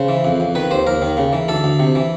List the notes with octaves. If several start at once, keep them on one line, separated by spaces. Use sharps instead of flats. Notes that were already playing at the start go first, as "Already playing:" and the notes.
Already playing: C#3 C5
E3
F2
F2
D#3 B4
D#2 C5
D#2 A#4
D#3
C#3
E3
D2 A4
D2
C3
E3